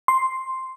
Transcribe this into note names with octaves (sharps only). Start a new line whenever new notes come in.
C6